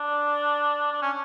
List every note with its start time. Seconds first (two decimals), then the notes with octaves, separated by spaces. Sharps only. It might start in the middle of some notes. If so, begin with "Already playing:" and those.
Already playing: D4
0.92 D4
1.02 C#4